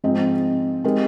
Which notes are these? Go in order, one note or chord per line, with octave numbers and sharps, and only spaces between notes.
G#2 F3 G#3 C4 D#4
G#3 C4 D#4 G4 A#4